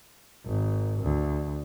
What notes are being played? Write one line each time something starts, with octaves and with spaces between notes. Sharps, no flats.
G#1
D2